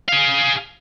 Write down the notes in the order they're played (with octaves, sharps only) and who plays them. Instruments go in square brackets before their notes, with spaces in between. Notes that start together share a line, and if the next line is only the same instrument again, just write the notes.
[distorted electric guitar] G#4 F5